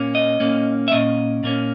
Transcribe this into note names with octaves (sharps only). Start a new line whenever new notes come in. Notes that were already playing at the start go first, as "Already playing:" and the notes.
Already playing: A#2 A#3 C#4
D#5
A#2 A#3 C#4
E5
A#2 A#3 C#4 D#5
A#2 A#3 C#4